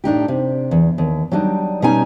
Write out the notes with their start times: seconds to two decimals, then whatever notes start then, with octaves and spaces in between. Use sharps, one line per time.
0.04 A2 D4 D#4 G4
0.28 C3
0.71 E2
0.98 D#2
1.32 F#3 G3 D4 D#4
1.82 B2 G3 C#4 D#4 G#5 A#5